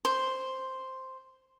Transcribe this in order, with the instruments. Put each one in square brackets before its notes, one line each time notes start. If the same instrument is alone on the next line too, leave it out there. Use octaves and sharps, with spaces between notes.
[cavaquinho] C5